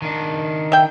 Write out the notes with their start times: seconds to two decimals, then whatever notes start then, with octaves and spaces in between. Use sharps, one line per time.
0.02 D#3 D4
0.72 E5 G5